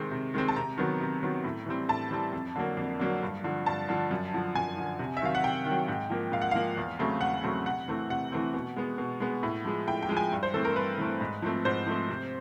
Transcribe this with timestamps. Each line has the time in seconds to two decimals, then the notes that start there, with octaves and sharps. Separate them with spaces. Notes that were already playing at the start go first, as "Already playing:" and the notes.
Already playing: C3 D#3 G#3 C4
0.11 C3
0.34 D#3 G#3 C4
0.48 A5
0.56 C3 A#5
0.78 D#3 F#3 B3
1.01 C3
1.23 D#3 F#3 B3
1.44 A2
1.66 E3 G3 C4
1.89 A2 A5
2.11 E3 G3 C4
2.33 F2
2.56 D3 F#3 A#3
2.77 F2
3.00 D3 F#3 A#3
3.23 G2
3.44 D3 F3
3.66 G2 A5
3.89 D3 F3
4.11 F#2
4.33 D3 F3
4.55 F#2 G#5
4.77 D3 F3
4.99 C3
5.17 E5
5.21 D#3 F#3 F5
5.35 F#5
5.44 C3 G5
5.65 D#3
5.71 F#3
5.88 G#2
6.10 F3 A#3
6.32 G#2 F5
6.42 F#5
6.51 F3 A#3 F5
6.77 E2
6.99 C#3 F#3 A3 C4
7.21 E2 F#5
7.44 C#3 F#3 A3 C4
7.66 C3 F#5
7.88 E3 A3 C4
8.10 C3 F#5
8.32 E3 A3 C4
8.54 B2
8.76 G#3 B3
8.98 B2
9.20 G#3 B3
9.43 A2
9.65 F3 G#3
9.87 A2 G5
10.03 G5
10.09 F3 G#3
10.17 G#5
10.32 G2
10.43 C5
10.54 E3 A3 C4 A4
10.65 A#4
10.76 G2 B4
10.98 E3 A3 C4
11.21 G#2
11.42 F3 A3 C4
11.65 G#2 C5
11.87 F3 A3 C4
12.08 C3